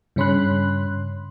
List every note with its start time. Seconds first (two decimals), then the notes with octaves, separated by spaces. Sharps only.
0.16 G2 C#3 C#4 B5 C6 F#6